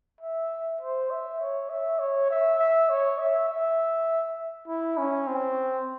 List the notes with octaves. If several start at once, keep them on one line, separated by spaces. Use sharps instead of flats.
E5
C5
E5
C#5
E5
C#5
E5
E5
C#5
E5
E5
E4
C#4
C4